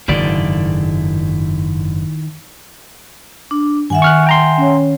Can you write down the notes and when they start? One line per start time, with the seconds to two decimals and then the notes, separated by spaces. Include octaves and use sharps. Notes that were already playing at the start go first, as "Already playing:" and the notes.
0.08 F#1 G#2 D3 D#3 E4 D5
3.51 D4
3.90 G2 D#3 E5 F#5 G#5
4.02 C#6 F6 F#6
4.27 G5 A#5 C6
4.58 C#4 C#5